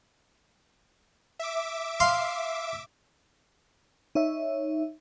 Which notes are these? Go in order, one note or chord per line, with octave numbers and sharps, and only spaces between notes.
E5 D6
F5 C6
D#4 C#5 E5